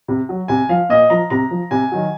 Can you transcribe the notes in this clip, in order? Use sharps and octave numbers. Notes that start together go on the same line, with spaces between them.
C3
F#3
C3 G#5
F3 F5
A#2 D#5
F3 A#5
C3 A#5
F3
C3 G#5
D#3 F#3